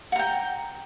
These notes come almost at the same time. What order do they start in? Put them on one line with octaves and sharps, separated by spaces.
F#5 A#5 G5